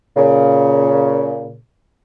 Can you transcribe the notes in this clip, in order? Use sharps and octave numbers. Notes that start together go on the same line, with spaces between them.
A#2 C#3